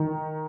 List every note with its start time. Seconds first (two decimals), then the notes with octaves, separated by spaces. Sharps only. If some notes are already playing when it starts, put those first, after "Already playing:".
Already playing: D#3